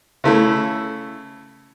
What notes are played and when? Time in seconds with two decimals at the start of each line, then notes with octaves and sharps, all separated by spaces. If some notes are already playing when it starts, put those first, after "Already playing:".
0.24 C#3 A3 E4